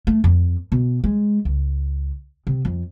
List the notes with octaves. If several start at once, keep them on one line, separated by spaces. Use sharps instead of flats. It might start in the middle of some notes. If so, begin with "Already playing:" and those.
A3
F2
B2
G#3
C#2
C3
F2